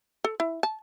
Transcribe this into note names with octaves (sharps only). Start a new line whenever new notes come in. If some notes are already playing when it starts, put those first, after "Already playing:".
A4
E4
A5